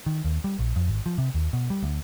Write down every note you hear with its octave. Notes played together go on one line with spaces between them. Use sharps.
D#3
D#2
G3
A#1
F2
G#1
F3
C3
D#2
B2
G3
D2